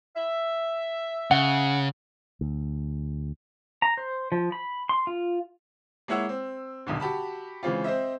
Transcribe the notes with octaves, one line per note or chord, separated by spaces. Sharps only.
E5
C#3 F#5
D2
A#5
C5
F3
B5
C6
F4
G#3 A#3 E4 C#5 F#5 E6
C4
D#1 B1 D3
F#4 G4 A5 B5
C#3 E3 G#3 C4 F4
C4 C5 D#5 E5